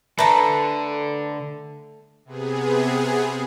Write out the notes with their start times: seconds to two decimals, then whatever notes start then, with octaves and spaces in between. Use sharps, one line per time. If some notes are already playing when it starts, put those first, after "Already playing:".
0.19 D3 A3 A4 B4 A#5
2.25 C3 B3 G#4